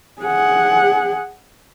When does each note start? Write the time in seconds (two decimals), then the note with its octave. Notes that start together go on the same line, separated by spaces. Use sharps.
0.22 G#4 F#5